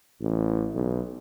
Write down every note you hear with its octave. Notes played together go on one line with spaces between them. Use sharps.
A1
B1